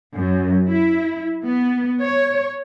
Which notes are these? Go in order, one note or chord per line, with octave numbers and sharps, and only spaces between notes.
F#2
E4
B3
C#5